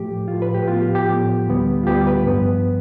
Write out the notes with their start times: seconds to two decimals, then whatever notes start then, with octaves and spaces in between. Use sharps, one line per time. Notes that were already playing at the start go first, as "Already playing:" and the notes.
Already playing: A2 F3 A3 G4
0.28 A2 F3 A3 F4
0.42 B4
0.55 G4
0.68 A2 F3 B3 F4
0.81 G4
0.95 G4
1.08 A2 F3 B3
1.48 D2 D3 G3 B3
1.83 F4
1.87 D2 D3 G3 B3 G4
2.07 B4
2.27 G2 F3 B3